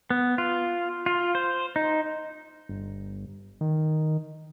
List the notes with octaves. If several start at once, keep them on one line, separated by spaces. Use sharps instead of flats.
B3
F4
F4
C5
D#4
G1
D#3